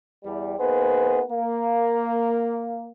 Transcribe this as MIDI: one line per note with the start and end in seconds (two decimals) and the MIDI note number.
0.24 0.55 40
0.24 0.55 55
0.59 1.20 58
0.59 1.20 59
0.59 1.20 63
0.59 1.20 68
0.59 1.20 71
0.59 1.20 72
1.29 2.88 58